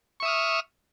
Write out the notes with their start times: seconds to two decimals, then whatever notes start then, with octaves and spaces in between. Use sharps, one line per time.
0.20 C#6
0.23 E5
0.25 D#6
0.28 F6